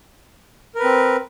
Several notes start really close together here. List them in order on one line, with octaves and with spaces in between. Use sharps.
A#4 B4 C4